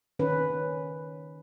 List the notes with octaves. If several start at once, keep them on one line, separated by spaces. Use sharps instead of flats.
D#3 C#4 B4